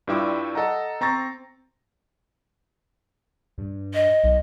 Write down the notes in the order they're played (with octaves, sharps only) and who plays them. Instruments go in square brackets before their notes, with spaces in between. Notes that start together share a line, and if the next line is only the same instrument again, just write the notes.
[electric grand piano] G2 G3 E4 F4 E5 D6
A4 D#5 F#5 A#5
C4 A#5 C#6 A6
[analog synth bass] G2
[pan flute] D#5
[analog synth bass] B1